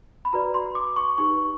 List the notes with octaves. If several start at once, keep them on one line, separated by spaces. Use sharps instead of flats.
B5
F#4 B4 D5 A#5
C6
D6
C#6
D#4 G4 B4 C#6